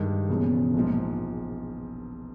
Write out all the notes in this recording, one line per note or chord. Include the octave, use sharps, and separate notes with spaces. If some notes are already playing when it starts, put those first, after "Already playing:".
Already playing: G2 D#3 G#3
E1 E2 C#3 F3
A#1 G#2 F3